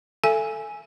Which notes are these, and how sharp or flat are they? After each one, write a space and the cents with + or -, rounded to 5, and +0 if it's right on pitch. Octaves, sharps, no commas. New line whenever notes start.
A4 +0 E5 +35 G#5 +0